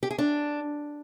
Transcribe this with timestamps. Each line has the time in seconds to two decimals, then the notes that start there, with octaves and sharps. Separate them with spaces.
0.03 G4
0.11 G#4
0.18 D4